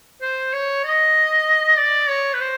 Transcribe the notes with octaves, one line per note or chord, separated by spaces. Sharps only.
C5
C#5
D#5
D5
C#5
B4
C5